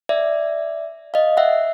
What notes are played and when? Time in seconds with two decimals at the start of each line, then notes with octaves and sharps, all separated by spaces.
0.09 D5 E5
1.14 D#5 F5
1.37 E5 F#5